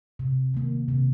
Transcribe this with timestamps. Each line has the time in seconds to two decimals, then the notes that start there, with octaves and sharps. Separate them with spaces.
0.19 C3
0.54 D#3 A#3
0.88 C3